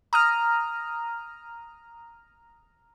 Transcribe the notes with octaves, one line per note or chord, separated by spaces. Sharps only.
A#5 D#6 F6